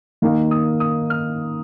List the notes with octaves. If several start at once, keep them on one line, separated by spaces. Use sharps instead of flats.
D#3 A#3 D#4 F5
D#6
D#6
F6